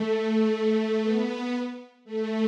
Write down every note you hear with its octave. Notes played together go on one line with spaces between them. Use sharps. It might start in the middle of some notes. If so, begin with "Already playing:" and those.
Already playing: A3
B3
A3